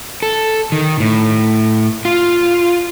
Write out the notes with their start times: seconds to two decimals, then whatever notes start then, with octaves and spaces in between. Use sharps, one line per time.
0.23 A4
0.72 D#3
1.00 A2
2.05 F4